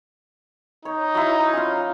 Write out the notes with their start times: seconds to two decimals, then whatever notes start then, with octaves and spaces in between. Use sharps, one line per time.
0.85 D#4 C#5
1.15 F#3 E4
1.53 C#4 F4 F5